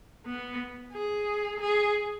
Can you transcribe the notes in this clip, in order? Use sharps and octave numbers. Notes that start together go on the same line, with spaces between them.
B3
G#4
G#4